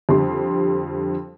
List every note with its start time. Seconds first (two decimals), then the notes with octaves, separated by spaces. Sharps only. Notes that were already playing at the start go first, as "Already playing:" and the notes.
0.09 F2 D3 G3 C6